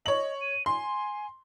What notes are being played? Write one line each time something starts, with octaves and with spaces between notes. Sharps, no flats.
C#5 D#5 F#7
D#7
G#5 C6